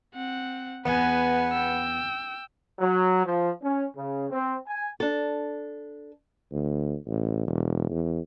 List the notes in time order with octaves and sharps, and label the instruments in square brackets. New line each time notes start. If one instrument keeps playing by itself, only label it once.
[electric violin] C4 F#5
[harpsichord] E2 [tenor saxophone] B3 [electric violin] B4 G#5
[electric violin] G5 E6
[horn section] F#3
F3
C#4
C#3
C4
G#5
[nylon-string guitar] D4 A4
[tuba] D2
A1
E1
E2